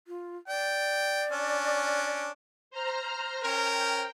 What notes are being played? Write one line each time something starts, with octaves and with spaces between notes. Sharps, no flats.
F4
D5 G5
C#4 D4
C5 A#5 F6
C#4 A#4 G5